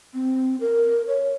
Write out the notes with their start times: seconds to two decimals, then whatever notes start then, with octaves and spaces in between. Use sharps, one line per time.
0.14 C4
0.61 A#4
1.08 C#5